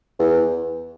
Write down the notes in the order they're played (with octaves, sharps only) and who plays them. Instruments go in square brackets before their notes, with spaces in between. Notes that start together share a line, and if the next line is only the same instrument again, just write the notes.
[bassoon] E2